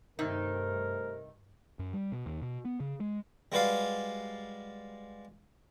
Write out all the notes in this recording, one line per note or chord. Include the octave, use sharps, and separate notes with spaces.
G2 C3 D#3 A3 D#4 G4 A#4 C5
F#2
G3
B2
D#2
B2
B3
C#3
G#3
G3 G#3 F#4 B4 D5 F5